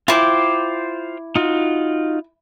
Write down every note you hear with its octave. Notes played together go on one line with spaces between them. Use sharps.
E4 F4 C5 G5 D6
D#4 F4 F#4